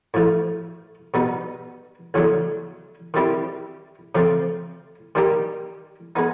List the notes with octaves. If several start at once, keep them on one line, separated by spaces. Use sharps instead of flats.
A2 F3 A3
B2 G3 B3 D#4
E2 C#3 F#3 A3 D4
D#3 G3 C4 E4 G4
C#3 F3 A3 C4
D#3 G3 A#3 D#4 G4
G#3 B3 D#4